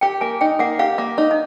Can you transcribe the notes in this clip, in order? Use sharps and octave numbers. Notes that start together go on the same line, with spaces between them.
G4 G5
A#3 G#5
D#4 G5
A#3 F#5
G4 F5
A#3
D#4
D#5